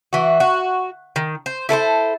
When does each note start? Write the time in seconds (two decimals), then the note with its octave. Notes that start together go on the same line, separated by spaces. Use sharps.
0.13 E3 F#4
0.40 F#4
1.16 D#3
1.46 C5
1.69 E4 A4 B4 C5